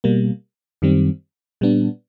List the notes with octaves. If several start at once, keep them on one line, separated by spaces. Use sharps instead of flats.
B2 G3 A#3
F#2 D#3 G3 C4
A#2 G3 B3 D4